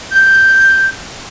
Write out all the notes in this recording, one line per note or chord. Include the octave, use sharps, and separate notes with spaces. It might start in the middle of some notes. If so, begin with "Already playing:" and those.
G6